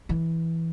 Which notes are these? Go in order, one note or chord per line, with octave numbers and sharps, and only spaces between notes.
E3